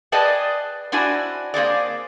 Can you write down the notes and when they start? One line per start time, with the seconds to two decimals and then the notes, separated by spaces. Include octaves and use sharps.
0.12 G#4 B4 D5 D#5 G5 A5
0.92 C4 D4 E4 F#4 G#5
1.54 A#3 C4 G#4 D5